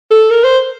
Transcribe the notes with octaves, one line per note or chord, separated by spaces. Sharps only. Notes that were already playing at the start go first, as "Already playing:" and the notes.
A4
A#4
C5